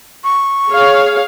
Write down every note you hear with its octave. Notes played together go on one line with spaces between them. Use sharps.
C#6
G#4 C#5 F5